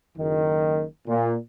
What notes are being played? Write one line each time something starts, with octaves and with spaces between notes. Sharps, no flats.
F#1 D#3
A#2